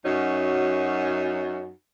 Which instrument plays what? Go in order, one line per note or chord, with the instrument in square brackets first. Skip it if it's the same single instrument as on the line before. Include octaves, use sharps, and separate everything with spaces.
[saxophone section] F#2 C#4 D#4 F#4